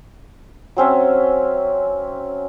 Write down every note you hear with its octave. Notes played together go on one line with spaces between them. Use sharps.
F#3 C4 C#4 E5